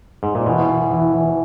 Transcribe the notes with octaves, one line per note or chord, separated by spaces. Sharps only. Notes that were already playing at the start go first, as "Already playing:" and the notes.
G#2
A#2
B2 E3
E3
E3
E3